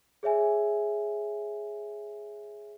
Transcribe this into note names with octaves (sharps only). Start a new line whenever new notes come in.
G#4 C#5 E5 G#5